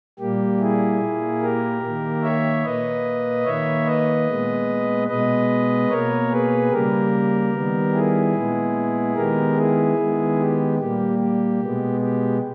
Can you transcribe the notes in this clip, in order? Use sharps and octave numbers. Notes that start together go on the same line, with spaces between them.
A#2 G3 A#3 G4
E4 G#4
A#2 A#3
G4 A#4
D#3 A#3
C#5 E5
A#2 A#3 B4 D#5
D#3 A#3 C#5 E5
B4 D#5
A#2 G#3 B3
B2 G#3 B3 B4 D#5
B2 A#3 A#4 C#5
G#4 B4
C#3 G3 A#3 G4 A#4
D#3 G3 B3
E4 G#4
A#2 G#3 B3
D#3 G#3 B3 G4 A#4
E4 G#4
D#3 G#3 B3
G4
A#2 G3 A#3 G4
G4
B2 G#3 B3
G4